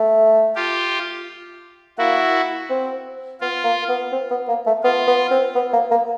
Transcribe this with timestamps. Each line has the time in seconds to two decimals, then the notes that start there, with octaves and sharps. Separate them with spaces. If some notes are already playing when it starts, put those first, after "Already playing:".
Already playing: A3
0.56 F4 G4
1.98 A#3 E4 F#4
2.70 C4
3.41 B3 F4
3.65 A#3
3.89 B3
4.12 C4
4.31 B3
4.48 A#3
4.67 A3
4.83 B3 F4
5.07 B3
5.31 C4
5.55 B3
5.73 A#3
5.91 A#3